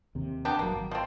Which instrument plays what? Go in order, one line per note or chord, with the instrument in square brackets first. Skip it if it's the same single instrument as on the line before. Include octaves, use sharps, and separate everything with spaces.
[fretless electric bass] D#2 C3
[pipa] B3 D4 G4
[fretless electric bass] G1 B2 F#3 [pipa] A#3
[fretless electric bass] G#1
[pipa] F3 C4